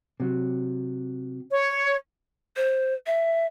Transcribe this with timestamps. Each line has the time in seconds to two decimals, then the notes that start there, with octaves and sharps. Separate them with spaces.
0.20 C3 F#3
1.51 C#5
2.56 C5
3.06 E5